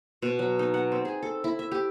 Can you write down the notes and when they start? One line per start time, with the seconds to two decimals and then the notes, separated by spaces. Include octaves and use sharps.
0.22 B2
0.39 F#3
0.59 D#4
0.74 F#5
0.92 C4
1.05 G#4
1.23 A4
1.44 E4
1.59 E5
1.72 G4